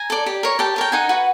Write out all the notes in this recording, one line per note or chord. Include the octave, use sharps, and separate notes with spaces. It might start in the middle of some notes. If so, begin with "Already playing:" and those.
Already playing: G#5 A#5
A4 D5
G4
A#4 C#5
G4 G5 A5
A#4 C#5 G5
D#4 F#5 G#5
F#4 B4